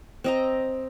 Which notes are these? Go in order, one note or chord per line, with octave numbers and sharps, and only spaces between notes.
C4 D#5 A#5